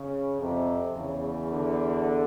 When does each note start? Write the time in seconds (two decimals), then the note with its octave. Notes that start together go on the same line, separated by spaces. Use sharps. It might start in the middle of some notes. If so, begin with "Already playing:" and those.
Already playing: C#3
0.40 F2 C3
0.95 E2 C#3
1.50 D3